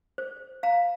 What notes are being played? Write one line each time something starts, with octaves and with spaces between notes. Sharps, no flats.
C5
F5 A#5